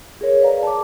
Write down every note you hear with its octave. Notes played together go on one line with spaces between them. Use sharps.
G#4 A#4 C#5
B4 D5 F5 A#5
A5 D6